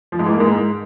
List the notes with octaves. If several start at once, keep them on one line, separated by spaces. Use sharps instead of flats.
F3
G#2
E3
A#3
G#2